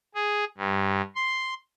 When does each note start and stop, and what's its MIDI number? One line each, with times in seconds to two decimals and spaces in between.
0.15 0.45 68
0.57 1.01 43
1.15 1.54 84